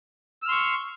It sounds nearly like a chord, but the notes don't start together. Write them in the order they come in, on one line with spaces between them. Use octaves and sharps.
E6 F6 C6 C#6